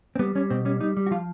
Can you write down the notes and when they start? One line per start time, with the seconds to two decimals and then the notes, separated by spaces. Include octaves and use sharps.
0.16 C4
0.19 G3 B3
0.35 G3 C#4
0.50 B2 C4
0.65 G3 C#4
0.80 G3 D#4
0.97 G3
1.07 F#4
1.11 F3 F4